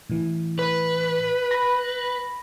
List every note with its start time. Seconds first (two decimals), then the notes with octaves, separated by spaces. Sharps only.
0.10 A2 E3
0.59 B4
1.51 B5 A#6